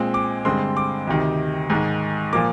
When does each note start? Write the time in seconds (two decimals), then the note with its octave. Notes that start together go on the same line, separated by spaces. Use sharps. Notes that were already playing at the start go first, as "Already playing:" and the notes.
Already playing: A#2 G#3 C4
0.14 D6
0.45 G2 D3 G#3 C4 C6
0.77 D6
1.07 D2 C3 D#3
1.70 G#2 D#3 G#3
2.33 A#2 F3 A#3 D6